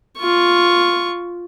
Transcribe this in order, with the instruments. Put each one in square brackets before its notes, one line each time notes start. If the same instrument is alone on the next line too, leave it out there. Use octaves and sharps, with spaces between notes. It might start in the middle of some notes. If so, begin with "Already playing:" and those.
[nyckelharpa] F4 C#6